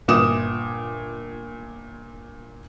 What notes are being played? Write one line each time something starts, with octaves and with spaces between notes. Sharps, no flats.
G1 A#2 D6 D#6 E7